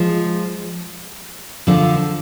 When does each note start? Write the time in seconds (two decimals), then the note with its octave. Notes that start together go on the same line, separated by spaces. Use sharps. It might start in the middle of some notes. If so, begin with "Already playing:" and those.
Already playing: F3 G#3
1.67 D3 F3